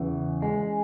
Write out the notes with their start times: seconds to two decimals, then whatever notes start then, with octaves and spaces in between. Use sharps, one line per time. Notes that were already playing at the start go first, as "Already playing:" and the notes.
Already playing: E2 C#3 E3
0.42 G#3